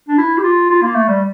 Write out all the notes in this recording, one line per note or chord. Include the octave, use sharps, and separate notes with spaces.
D4
E4
G4
F4
F4
A#3
A3
G3